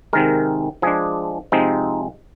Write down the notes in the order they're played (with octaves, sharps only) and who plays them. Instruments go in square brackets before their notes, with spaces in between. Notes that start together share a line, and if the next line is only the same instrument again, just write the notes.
[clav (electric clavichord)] C3 D#3 G#3 A#4
F3 G#3 D4 G#4
C3 F3 G#3 C4 D#4